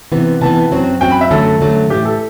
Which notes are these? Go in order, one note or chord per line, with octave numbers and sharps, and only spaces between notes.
C3 E3 B3
C3 E3 B3 A5
F#2 F#3 C4 F#4
F#2 F#3 C4 F#4 G5
B5
E5
F#2 D3 F#3 A3 A4
F#2 D3 F#3 A3
A2 E3 A3 G4
A4